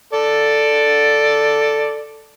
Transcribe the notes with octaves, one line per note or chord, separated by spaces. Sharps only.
A4 D5